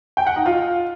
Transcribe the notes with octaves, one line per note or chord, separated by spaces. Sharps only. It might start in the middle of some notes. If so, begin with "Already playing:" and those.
G5
F#5
D#4
F4